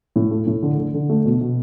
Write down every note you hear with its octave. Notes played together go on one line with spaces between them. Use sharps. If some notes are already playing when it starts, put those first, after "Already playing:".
A2
A3
A2
D3
D3
D3
A3
B2
B2